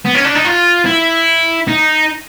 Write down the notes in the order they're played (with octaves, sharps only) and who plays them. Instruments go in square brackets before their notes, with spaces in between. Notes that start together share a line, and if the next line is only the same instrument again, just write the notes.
[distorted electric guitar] B3
C#4
D4
D#4
F4
E4
D#4